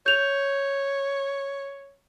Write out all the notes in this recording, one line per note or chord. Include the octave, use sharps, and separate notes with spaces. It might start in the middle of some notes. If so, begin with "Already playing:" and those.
C#5 G6 F7